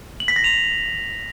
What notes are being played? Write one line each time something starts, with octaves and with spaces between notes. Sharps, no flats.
F#7
B6
A#6
F7